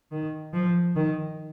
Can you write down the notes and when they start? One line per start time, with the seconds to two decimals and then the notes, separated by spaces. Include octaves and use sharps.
0.12 D#3
0.54 F3
0.96 D#3